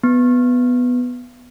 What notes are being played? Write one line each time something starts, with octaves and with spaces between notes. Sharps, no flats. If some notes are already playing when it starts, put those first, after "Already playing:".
B3